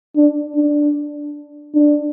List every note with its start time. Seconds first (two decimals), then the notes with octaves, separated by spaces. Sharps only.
0.17 D4
0.56 D4
1.75 D4